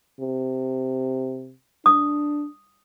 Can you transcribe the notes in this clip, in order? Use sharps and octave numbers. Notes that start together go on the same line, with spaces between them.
C3
D4 D#6